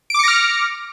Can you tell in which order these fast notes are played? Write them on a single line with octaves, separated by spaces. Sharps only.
D7 D6 C#7 A#6 F6